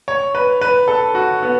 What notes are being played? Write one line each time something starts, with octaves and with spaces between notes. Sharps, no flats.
C#5
B4
B4
A4
F#4
B3